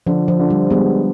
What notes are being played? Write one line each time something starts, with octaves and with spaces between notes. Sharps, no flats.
D3 F3
F3
D3
G3
G3 G#3 B3